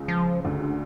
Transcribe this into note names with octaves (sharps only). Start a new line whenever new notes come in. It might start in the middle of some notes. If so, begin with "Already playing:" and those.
Already playing: C#2 C#3
F3
D2 D3